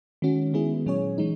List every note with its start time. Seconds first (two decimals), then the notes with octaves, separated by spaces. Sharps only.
0.22 D#3 G#3 C#4 F#4
0.54 D#3 G#3 B3 E4 G#4
0.86 A#2 F#3 C#4 G#4 C#5
1.18 E3 G#3 D#4